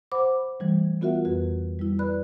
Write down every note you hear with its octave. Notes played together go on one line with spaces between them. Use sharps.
C5 F#5 B5 D6
E3 G3 A3
B3 F4 F#4 A#4 E5 F#5
F2 F#4 B4
G3 E4
B4 D5 B5 F#6